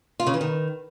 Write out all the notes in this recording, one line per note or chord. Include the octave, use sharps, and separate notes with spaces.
F4
C#3
E3
D#3